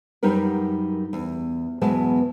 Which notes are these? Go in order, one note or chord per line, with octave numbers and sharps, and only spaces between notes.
F#2 F#3 G3 D#4 A#4 B4
E2
E2 B2 F#3 G#3 B4 A5